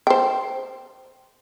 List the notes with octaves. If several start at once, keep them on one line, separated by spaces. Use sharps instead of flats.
C5 G5